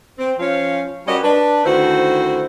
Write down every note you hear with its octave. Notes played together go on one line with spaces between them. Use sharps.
C4
F3 C#4 F5
G3 C#4 F#4 G4 A#4 D#5
D4 B4
D2 D#3 E4 F#4 C5